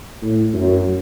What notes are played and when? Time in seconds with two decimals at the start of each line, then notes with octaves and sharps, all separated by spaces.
0.22 A2
0.54 F#2